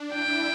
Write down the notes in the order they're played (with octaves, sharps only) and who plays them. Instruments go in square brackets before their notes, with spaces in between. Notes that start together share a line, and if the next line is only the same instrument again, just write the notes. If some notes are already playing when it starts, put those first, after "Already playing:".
Already playing: [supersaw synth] D4
[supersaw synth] E4 [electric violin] G5